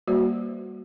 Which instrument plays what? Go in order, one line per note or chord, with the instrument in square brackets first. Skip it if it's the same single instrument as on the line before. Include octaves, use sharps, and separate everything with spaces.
[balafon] G3 A#3 F#4 B4 C5 D5